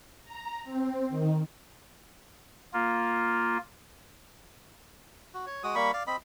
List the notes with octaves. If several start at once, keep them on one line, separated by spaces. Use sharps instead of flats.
A#5
C4
D#3
A#3 F4
F#4
C#5
G#3 F#4 D#6
G3 A#3 B5 C#6
D5 F5
C4 D#5 B5